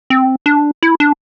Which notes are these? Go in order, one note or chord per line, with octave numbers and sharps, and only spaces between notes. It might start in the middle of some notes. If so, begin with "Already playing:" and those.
C4
D4
E4
D4